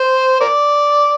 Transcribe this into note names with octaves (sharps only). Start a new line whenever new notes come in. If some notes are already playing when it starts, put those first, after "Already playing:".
Already playing: C5
A#4 D5